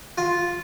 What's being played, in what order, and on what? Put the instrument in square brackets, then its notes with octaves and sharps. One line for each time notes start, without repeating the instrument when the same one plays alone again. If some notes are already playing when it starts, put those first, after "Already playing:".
[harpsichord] F4